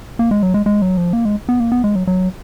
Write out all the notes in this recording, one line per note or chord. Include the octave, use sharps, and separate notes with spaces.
A#3
G#3
F#3
G#3
G#3
F#3
F3
A#3
G#3
B3
A#3
B3
G#3
F#3
F#3